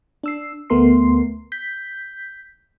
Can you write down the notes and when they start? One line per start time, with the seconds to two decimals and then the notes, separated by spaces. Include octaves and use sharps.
0.23 D4 E6 C7
0.70 D2 A3 B3 A#4 C6 C7
1.52 G6 B6